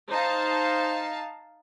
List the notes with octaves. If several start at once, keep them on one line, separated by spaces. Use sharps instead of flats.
D#4 C5 F5 A5